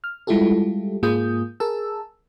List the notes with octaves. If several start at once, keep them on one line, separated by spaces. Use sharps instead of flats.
F6
G3 G#3 E4 F4 G4 A4
G#2 A#3 F4 G#4 D#6 G6
G#4 A#4 A5 E6